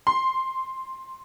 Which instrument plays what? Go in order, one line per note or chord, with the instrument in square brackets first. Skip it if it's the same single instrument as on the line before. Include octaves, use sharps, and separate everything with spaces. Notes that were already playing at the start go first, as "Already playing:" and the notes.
[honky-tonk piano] C6